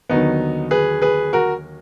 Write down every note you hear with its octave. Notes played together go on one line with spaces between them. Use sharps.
D#2 D3 F#3 B3 D#4
G#4 B4
G#4 B4
F#4 A#4